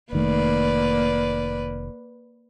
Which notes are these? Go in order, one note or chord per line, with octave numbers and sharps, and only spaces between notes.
F1 D#3 A3 A#3 B4 D5